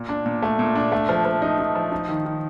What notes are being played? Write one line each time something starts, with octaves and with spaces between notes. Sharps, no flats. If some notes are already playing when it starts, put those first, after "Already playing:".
Already playing: A#2
D4
A#2
A3
A#2
D4
A3
F3
F3
D#4
D#4
F3
D#4
D#3
D#3